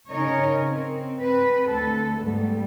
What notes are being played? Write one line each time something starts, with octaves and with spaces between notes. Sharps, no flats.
C#3 C#4 D#4 A#4 C#5 D#5
C4
C4 B4
D2 A4
G#2 G3 A3 B3